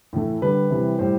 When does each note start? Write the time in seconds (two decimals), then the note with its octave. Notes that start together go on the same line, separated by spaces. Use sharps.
0.13 A2 E3 A3
0.42 D3 G3 B4
0.70 C3 E3 G3
0.99 A2 G3 C5